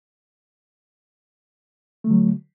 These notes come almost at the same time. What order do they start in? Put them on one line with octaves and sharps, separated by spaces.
A3 D3 F#3